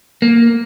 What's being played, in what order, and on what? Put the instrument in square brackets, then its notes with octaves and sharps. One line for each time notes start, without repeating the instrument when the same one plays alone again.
[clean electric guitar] A#3